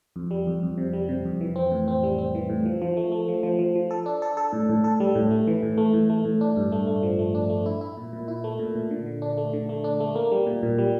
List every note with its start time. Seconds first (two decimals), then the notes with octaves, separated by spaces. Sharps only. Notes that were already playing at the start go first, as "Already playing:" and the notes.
0.16 F2
0.31 G3
0.47 F2
0.63 F2
0.78 C3
0.93 G3
1.09 C3
1.25 F2
1.41 E3
1.56 C4
1.72 A2
1.88 C4
2.03 G3
2.18 C4
2.35 E3
2.49 A2
2.66 F3
2.82 F3
2.97 A3
3.12 A3
3.28 F3
3.43 F3
3.59 F3
3.75 F3
3.91 A4
4.06 D4
4.22 A4
4.37 A4
4.53 A2
4.69 A2
4.84 A4
5.00 G3
5.15 A2
5.31 A3
5.47 E3
5.63 A2
5.78 A3
5.93 A2
6.10 A3
6.25 A2
6.41 D4
6.57 G2
6.72 A3
6.87 A3
7.03 F3
7.19 A3
7.35 D4
7.49 A3
7.66 E4
7.81 E4
7.97 A#2
8.13 A#2
8.28 E4
8.44 A3
8.59 A#2
8.75 A#2
8.91 D3
9.06 D3
9.22 D4
9.38 A3
9.53 D3
9.69 A3
9.84 D4
10.00 A3
10.16 A#3
10.32 G3
10.47 A#2
10.63 A#2
10.78 G3